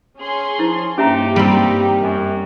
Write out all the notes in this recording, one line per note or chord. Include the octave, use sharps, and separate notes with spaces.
C#4 G#4 C6
F3 E4
G2 A#3 C#4 D#4 G4 E5 A#5
G3 C4 G4
F#2